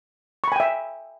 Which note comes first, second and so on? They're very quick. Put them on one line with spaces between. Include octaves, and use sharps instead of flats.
C#6 B5 G#5 G5 E5